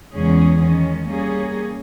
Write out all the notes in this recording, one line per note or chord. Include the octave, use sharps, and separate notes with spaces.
E2 C#3 G#3 C#4 G#4
D#3 G#3 C#4
G3 A#3 C#4 G#4